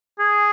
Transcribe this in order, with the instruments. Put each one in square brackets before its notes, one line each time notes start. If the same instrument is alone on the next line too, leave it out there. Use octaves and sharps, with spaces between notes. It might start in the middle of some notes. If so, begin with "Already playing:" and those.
[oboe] G#4